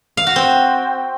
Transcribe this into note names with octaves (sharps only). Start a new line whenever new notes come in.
F5
F#4
C4